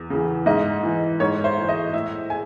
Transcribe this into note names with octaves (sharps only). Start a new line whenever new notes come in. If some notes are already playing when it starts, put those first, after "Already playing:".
Already playing: E2
C#3 E3
G#2 D#5
E3
G#2 C#5
C5
E3
D#5
A2 E5
G#5